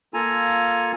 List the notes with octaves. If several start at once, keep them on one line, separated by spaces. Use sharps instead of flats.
A#3 F4 A4 G#5 A#5